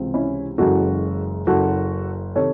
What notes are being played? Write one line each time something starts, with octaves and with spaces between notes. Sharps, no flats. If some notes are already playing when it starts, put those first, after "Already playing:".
Already playing: C#2 C3 E3 C4
C#4 E4
F#1 F#2 C#3 E3 G#3 F#4 A4
F#1 F#2 C#3 F#4 A4
C3 D#3 A4 C#5